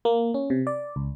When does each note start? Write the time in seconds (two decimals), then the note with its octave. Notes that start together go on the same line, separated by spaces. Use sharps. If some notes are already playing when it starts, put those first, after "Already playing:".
0.05 A#3
0.34 C#4
0.50 C3
0.67 D5
0.96 C#2